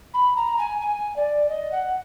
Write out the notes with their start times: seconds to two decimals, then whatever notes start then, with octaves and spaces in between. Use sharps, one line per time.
0.14 B5
0.36 A#5
0.59 G#5
0.81 G#5
1.16 D5
1.49 D#5
1.72 F#5